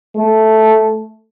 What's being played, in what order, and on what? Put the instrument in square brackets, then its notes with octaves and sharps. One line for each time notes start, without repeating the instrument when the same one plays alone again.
[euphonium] A3